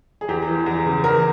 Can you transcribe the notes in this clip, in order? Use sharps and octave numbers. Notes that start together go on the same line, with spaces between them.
G#4
E2 G4
E3
E2
C#3
E2 A#4